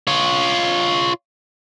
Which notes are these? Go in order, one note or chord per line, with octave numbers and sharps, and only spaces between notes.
F4 C#5